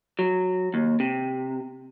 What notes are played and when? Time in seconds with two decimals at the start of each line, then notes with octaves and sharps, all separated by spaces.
0.19 F#3
0.74 D#2
1.00 C3